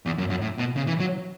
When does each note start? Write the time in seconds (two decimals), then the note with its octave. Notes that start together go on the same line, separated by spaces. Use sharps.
0.06 E2
0.18 F#2
0.30 F#2
0.42 A2
0.58 B2
0.77 C#3
0.87 E3
1.00 F#3